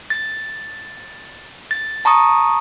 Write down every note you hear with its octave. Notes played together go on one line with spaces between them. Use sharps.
A6
A6
A5 A#5 C#6 D#6